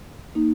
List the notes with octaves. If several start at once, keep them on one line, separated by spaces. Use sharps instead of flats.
A#3 D#4